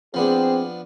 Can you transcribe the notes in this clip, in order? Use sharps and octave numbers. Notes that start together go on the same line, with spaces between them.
F3 B3 C4 D4 G#4